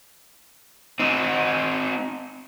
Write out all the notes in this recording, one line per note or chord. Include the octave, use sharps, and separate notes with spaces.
C4 D#4